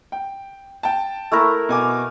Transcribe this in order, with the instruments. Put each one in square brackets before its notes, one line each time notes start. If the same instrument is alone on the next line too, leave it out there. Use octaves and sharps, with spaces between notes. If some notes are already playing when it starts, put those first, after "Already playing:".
[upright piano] G5
G5 A5
[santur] A3 E4 A#4
[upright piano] B2 G#5 D6